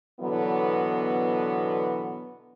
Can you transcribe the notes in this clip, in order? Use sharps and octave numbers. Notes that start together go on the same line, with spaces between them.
B2 D3 E3 F#3 B3